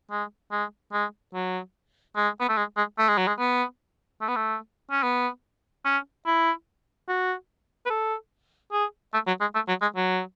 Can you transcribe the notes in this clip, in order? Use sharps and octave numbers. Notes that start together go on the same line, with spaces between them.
G#3
G#3
G#3
F#3
G#3
B3
A3
G#3
G#3
A3
G#3
F#3
G#3
B3
A3
B3
A3
C#4
B3
C#4
E4
F#4
B4
A4
G#4
A3
F#3
G#3
A3
F#3
G#3
F#3